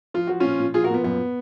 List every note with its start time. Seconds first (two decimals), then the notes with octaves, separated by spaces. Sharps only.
0.14 F3 F4
0.27 F3 F#4
0.40 A#2 C#4 F4
0.59 A#2
0.74 F3 F4 G#4
0.84 F#4 A#4
0.90 A#2 B3
1.04 F#2 B3